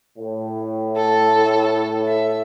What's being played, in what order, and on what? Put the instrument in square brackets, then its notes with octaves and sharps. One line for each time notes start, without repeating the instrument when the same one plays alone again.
[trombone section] A2
[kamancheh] A4
E5